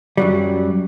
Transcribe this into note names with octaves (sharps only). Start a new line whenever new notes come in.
F#2 F#3 G3